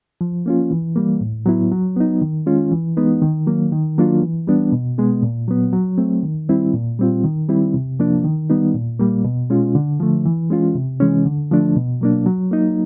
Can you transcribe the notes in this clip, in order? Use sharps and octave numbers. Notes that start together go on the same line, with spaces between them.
F3
A#3 C#4 F4
E3
G3 A#3
A2
F#3 B3 E4
F#3
B3 D#4
D#3
G#3 C#4 F4
E3
G#3 B3 D#4
D#3
F#3 A#3
D#3
F#3 A#3 D4 F4
E3
G3 B3 D4
B2
G#3 B3
A#2
F#3 B3
F#3
A3 C4
D#3
G3 C4 E4
A#2
G3 C4 F4
D#3
G3 C4 E4
C3
F3 A#3 D4
D#3
G3 B3 D#4
A#2
G3 A#3
B2
G#3 C#4 F4
D3
F3 A3
E3
G#3 C#4 F4
C3
E3 G#3 C#4
D3
F3 A3 D4
B2
F#3 A#3 D4
F#3
A#3 D#4